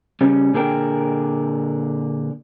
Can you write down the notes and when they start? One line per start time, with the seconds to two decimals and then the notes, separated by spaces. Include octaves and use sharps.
0.21 C#3 G3 C#4
0.54 A#2 D3 G#4 A#4 G5